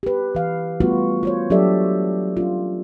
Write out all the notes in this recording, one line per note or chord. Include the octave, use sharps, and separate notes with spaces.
G4 B4
E3 F5
G3 A3 B3 F4 F#4 B4
F4 C5 C#5
F#3 D4 G4 A4 D5 E5
C#4 F4